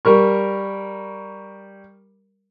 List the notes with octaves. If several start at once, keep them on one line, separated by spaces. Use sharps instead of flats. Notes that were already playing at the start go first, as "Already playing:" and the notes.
G3 A#4 C#6